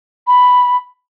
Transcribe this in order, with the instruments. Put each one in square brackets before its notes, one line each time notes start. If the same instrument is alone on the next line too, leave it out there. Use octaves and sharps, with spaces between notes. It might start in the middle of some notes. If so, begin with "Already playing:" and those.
[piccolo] B5